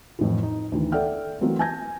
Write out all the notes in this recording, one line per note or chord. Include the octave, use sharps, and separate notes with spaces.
F2 A2 E3
D#4
D2 D#3 E3
A4 D5 E5 F#5 G5 F6
E3 F#3 A3 A#3 C4
G#5 A5 G6 G#6 A#6